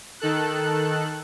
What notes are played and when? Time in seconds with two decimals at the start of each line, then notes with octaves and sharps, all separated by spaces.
0.20 D#3 A4 F#6